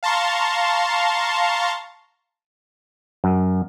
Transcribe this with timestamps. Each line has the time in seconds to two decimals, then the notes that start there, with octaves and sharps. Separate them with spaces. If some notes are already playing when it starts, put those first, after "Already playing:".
0.03 F5 A5 A#5 C6 C#6
3.24 F#2